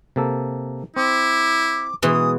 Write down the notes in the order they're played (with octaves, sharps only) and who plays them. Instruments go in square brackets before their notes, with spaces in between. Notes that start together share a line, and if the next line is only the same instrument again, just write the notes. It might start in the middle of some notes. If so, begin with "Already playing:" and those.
[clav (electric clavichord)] C3 A#3 A4
[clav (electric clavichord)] C4 [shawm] E4 [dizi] D6
[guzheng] B2 E3 G#3 [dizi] D#6